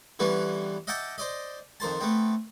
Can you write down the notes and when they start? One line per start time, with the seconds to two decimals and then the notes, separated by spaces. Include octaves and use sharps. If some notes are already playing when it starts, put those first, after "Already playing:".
0.19 D3 E3 G3 B3 C#4
0.87 D#5 E5 F#5 G5 A5 D6
1.18 C5 D5 D#5
1.80 F2 D#3 C5 A5
2.00 A3 B3 C4